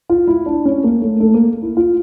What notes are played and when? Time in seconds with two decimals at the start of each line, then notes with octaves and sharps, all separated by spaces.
0.09 F4
0.27 E4
0.46 D4
0.65 C#4
0.84 A#3
1.02 A3
1.20 A3
1.34 A#3
1.62 E4
1.77 F4